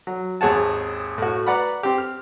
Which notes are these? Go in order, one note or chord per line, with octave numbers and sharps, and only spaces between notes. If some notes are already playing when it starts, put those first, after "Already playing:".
F#3
G#1 D#2 G#4 C#5 F#5 A5
A2 F#4
B4 D5 F#5 A#5 B5
C4 G4
F6